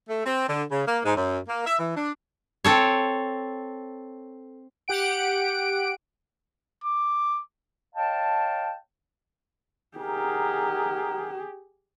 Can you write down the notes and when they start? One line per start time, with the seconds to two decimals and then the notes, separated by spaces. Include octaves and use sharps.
0.09 A3
0.26 C4
0.48 D3
0.71 C#3
0.87 A#3
1.05 G#2
1.16 F#2
1.48 A#3
1.66 E5
1.79 E3
1.96 D4
2.64 C4 A4 C#5
4.88 G4 F#5 D7
6.84 D6
7.95 C#5 D#5 F5 G5 A5
9.97 D#4 G4 G#4 A#4 F#5